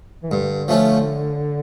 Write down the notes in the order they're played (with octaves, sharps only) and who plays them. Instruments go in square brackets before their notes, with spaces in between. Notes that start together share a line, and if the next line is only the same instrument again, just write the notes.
[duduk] E3
[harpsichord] G2 [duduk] D3
[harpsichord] F3 A3 C#4